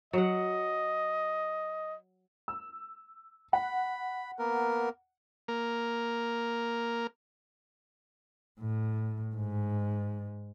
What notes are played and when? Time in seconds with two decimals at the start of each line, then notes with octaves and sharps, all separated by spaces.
0.13 F#3 D#5 F#5
2.48 E6
3.53 F#5 B5
4.39 A#3 B3 A#4
5.48 A#3 A#4
8.61 A2
9.35 G#2